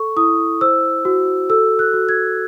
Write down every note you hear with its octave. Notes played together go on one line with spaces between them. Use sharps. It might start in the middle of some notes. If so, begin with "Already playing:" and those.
Already playing: A4 C#6
E4 D#6
C5 E6
F#4
A4 E6
F#6
F#4
G#6